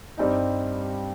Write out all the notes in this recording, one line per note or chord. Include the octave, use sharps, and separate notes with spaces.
G2 G3 C4 D#4